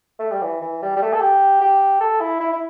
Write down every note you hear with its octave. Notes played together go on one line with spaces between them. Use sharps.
A3
G3
E3
E3
G3
G3
A3
A4
G4
G4
A4
E4
E4
E4